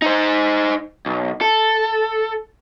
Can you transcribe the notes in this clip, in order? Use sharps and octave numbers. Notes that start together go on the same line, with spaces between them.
D#4 C5
B1
A4